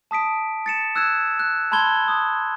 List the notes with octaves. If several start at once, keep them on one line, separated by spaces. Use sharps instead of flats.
A5 D#6 B6 D7
A6 C#7 E7
E6 F#6 G#6 E7
F#6
A5 B5 C6 G#6 G7
D#6